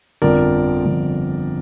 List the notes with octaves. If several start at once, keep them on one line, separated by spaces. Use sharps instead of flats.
G1 F2 D3 F3 A#4 D5
G1 F2 D3 F3